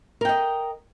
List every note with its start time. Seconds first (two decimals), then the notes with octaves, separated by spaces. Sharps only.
0.21 A#4
0.25 G5
0.29 D#5